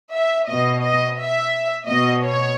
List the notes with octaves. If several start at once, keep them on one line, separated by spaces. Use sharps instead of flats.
E5
B2 D#5
D#5
E5
B2 D#5
C#5